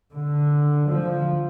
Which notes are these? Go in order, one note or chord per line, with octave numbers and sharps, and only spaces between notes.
D3
F3